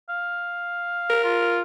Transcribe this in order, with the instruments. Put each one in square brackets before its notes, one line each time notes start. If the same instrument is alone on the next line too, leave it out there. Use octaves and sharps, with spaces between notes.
[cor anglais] F5
[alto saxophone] A#4
[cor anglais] F4